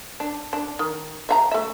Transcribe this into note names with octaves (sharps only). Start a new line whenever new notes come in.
D4
D4
D#3
E5 F5 A#5
A3 E5